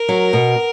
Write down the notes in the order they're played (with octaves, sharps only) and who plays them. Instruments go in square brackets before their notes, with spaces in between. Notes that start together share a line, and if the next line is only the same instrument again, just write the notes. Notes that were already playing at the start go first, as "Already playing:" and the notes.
Already playing: [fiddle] A#4
[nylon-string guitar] F#3
B2